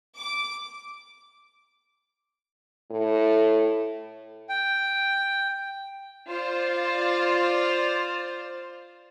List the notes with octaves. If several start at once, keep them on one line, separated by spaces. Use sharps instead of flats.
D6
A2
G5
F4 C5 D5